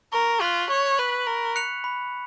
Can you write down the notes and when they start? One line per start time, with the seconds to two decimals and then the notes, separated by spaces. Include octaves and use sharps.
0.13 A#4 C#6
0.41 F4 F#6 B6 F#7
0.70 C#5 C#6
0.98 B4 F#6 B6 F#7
1.27 A#4 B5
1.56 F#6 C#7 F7
1.84 B5